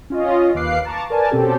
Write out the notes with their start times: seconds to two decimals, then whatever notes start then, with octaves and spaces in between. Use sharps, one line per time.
0.10 C#4 F4 D#5
0.55 D#2 B4 F5 D6 F#6 C7
0.85 A5 A#5 C#6 D6
1.10 A#4 B4 D5 G#5 A5
1.31 B2 C4 C#4 G4 A4